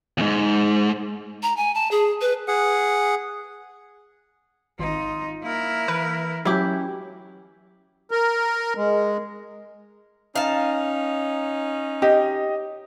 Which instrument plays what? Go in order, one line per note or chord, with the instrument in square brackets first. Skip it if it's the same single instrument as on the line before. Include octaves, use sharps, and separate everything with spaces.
[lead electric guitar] E2 G#2
[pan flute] A#5
G#5
A5
G#4
B4
[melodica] G#4 F#5
[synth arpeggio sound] G#1 [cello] D#4 [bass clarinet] F4
[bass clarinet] A#3 [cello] E4 A#4
[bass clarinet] E3 [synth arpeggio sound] B4
[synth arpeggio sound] F#3 [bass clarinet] C#4 [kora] E4 G4
[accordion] A#4
G#3
[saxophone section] C#4 D#4 [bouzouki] F5 A5
[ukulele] G4 [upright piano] D#5